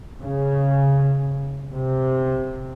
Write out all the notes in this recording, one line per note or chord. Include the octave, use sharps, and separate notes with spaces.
C#3
C3